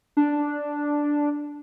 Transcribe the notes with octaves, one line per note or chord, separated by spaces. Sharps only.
D4